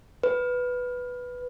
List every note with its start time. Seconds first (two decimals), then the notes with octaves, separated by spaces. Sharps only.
0.23 B4